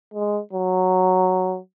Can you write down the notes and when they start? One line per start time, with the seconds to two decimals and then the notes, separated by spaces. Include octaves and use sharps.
0.14 G#3
0.53 F#3